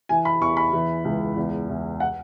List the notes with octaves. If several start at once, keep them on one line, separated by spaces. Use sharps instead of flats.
E3 G#5
B5
E2 C#6
B5
E3
C#2
E2
E2
F#5